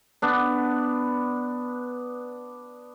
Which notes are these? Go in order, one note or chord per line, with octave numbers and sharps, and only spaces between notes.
B3 D4